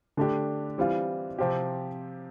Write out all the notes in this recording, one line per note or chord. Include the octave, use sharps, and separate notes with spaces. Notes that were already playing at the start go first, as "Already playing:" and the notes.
D3 A3 D4 G4
E3 G3 C4 F4
C3 F3 C4 G4